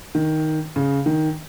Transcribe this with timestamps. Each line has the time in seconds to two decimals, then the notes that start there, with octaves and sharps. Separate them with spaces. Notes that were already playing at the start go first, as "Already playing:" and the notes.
0.15 D#3
0.76 C#3
1.06 D#3